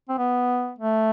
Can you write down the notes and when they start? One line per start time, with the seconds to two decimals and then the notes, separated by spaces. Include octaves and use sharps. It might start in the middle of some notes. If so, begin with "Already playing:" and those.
0.09 C4
0.18 B3
0.79 A3